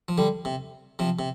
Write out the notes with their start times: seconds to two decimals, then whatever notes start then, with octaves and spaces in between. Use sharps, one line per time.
0.08 F3
0.18 D3 G3
0.45 C3
0.99 C3 F3
1.19 C3